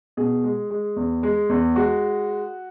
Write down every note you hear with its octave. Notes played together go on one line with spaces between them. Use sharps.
B2 G#4
G#3
G#3
E2
G#3
E2
G#3 F#4